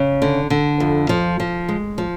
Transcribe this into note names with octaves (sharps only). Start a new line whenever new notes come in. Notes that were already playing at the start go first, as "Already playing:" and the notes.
Already playing: C#3
D3
D3
F2
F3
F3
G#3
F3